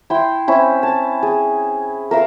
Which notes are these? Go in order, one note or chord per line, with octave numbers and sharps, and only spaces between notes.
E4 G5 C6
C4 C#4 E4
A5
G#4
A#4 E5 F5